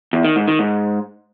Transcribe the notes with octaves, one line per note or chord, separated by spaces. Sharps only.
E2
D#3
G#2
D#3
G#2